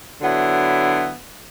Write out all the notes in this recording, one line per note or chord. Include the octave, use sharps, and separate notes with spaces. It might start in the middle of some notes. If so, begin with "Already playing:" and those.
D3 F#3 B3 E4